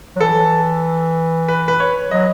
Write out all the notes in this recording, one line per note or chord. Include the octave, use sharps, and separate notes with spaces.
F#3
E3 A4
B4
B4
C#5
F#3 D#5